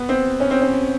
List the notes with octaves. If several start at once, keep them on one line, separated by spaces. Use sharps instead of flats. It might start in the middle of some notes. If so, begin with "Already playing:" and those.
Already playing: B3
C4
C#4
C4
C#4